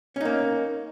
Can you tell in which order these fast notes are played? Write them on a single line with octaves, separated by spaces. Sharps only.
C#4 D#4 A#3